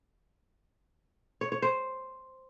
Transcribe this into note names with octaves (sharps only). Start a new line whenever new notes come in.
C#5
C#5
C5